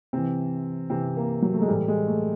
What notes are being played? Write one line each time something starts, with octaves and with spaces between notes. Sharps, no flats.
C3 E3 C4
C3 E3 C4
A#3
F#3
A3
G#3
A2 E3 G3
G#3
A3